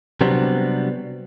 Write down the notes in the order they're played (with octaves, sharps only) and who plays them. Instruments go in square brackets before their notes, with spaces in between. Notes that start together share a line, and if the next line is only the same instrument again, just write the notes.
[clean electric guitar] C3 F#3 G3 B3 C4 D4